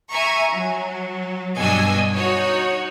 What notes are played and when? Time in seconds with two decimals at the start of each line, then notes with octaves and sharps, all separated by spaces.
0.11 E5 G#5 A#5 C#6
0.52 F#3
1.58 G2 B2 D4 D#5 G#5 E6
2.15 D#4 F#4 C#5